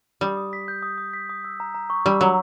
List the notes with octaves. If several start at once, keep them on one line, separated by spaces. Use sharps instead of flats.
G3 D#6
D#6
B6
G6
D#6
D#6
B6
D#6
E6
A#5
A#5
C#6
G3 E6
F#3 A#5